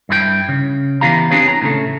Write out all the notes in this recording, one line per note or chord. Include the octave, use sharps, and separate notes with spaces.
G2 E4 G#4 G5
C#3
E3 B3 E4 G4 F5 A#5
C4 D4 G4 G#4 B4 C#5
A#5
A2 C#3 A3